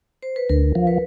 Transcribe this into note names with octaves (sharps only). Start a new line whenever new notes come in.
C5
B4
D2 A#4
F3
B4